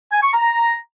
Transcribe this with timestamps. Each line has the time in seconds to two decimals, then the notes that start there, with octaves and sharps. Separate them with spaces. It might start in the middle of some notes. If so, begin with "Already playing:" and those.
0.12 G#5
0.23 C#6
0.33 A#5